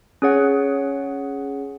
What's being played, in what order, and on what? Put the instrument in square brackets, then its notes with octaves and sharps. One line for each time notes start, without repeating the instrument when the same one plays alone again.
[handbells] C#4 G#4 C#5 F#5